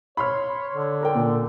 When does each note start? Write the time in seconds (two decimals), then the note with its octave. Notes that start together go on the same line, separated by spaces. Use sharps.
0.17 C#5 B5 C6 F6
0.74 D3
1.01 A4 A#4 G5
1.15 A#2